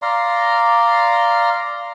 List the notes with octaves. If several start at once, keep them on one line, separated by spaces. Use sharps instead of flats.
D5 F5 A#5 C6